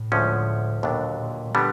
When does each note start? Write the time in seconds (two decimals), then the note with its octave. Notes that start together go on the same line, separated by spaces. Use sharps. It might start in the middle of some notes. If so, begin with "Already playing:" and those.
Already playing: A2
0.12 D2 D3 F3 G#3 C#4
0.83 D#2 A#2 D3 F#3 B3 D4
1.19 A#2
1.55 D3 G3 B3